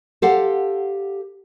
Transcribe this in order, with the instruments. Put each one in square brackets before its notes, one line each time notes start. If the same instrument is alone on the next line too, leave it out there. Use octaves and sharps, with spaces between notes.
[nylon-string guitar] G4 A4 C5 F5 F#5